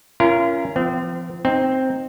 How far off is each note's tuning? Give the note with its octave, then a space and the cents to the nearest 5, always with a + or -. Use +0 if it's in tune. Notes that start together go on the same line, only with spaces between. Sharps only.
C#4 +0 F4 -40 A#4 +0
F3 -20 C4 -40
C4 +0 D#4 +0